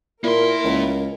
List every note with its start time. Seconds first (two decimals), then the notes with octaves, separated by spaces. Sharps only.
0.24 A#2 A#3 E4 A#4 C6
0.64 C#2